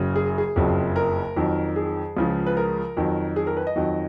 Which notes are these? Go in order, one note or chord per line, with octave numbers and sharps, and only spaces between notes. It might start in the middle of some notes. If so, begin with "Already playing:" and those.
Already playing: F#1 F#2 C#3 F#3
G#4
G#4
F#1 F2 C#3 F#3
A#4
F2 D#3 F#3
G#4
C#2 C#3 F3
B4
A#4
F2 D#3 F#3
G#4
A#4
B4
D#5
F2 D#3 F#3